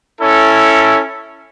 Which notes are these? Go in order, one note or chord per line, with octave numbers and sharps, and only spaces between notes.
C#4 E4 A4